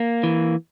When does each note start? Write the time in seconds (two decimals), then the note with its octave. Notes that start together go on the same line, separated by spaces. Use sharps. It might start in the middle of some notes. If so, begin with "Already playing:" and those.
Already playing: A#3
0.23 E3